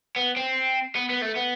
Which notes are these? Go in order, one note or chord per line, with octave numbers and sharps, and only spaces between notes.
B3
C4
B3
B3
A3
B3